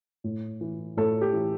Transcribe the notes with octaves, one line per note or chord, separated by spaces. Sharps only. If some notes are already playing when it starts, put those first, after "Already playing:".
A2
E3
A2 A4
G4
E3